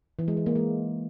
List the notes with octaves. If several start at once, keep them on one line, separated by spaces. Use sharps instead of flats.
E3
G#3
E3
A#3
G#3